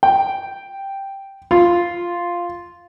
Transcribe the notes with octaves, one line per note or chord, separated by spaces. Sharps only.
G5
F4